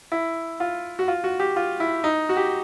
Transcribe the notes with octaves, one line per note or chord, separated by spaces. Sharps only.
E4
F4
F#4
F4
F#4
G4
F4
E4
D#4
F#4
G4